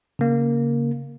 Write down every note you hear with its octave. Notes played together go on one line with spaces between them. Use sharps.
C#3 A#3